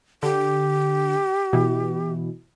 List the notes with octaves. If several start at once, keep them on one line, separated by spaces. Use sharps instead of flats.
D3 G4
B2 E3